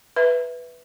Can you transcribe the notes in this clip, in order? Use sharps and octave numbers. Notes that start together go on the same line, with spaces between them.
B4 E5